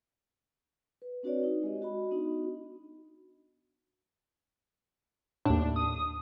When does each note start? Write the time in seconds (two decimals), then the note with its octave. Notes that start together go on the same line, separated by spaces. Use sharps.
1.02 B4
1.23 C4 D4 F#4 B4 C#5 D5
1.43 D#4
1.63 G#3 G4 D#5
1.82 F#4 D#5 B5
2.11 B3 D4 D#4 F#4
5.45 D#2 A2 D4
5.76 D#6